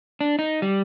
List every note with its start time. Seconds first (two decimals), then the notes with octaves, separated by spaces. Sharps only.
0.21 D4
0.39 D#4
0.62 G3